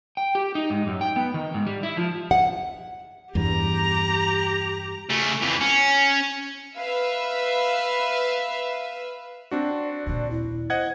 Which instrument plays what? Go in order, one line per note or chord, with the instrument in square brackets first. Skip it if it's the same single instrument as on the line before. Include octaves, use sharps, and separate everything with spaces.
[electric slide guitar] G5
G4
D#4
G#2
F#2
G5
B3
D#3
G#2
G3
E4
F3
[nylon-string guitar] F#5
[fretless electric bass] E2 G2 [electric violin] G4 A#5
[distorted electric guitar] C#3 A3
F2 E3
C#4
[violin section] B4 E5 F5
[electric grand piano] C4 D4 F#4 [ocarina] D5
[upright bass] D#2 A#2 [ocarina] D5
[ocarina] E4
[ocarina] C5 [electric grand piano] D#5 F#5 G#6